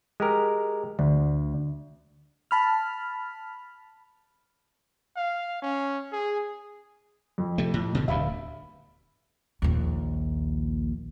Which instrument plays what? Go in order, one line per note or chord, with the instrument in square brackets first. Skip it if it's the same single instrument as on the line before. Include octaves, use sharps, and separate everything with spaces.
[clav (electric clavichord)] G#3 G4 A#4
[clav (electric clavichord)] D2 [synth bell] D3
[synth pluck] A5 B5 F6
[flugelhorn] F5
C#4
G#4
[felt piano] F2
[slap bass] C3 A3
A2
B2 D3
[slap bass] D1 D2 G2 [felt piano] E5 F5 B5
[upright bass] A#1 D#2